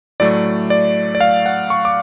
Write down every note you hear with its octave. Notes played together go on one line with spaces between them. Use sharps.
A2 F#3 A3 D5
D5
D5
F5
F#5
C#6
D6